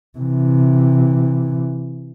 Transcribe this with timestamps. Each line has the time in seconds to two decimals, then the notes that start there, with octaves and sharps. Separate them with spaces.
0.19 C3 E3